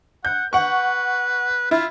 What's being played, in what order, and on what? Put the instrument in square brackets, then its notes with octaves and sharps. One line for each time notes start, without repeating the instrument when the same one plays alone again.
[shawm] F#5 [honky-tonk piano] G6
[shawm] B4 [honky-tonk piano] F#5 C#6
[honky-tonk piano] E4 [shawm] F4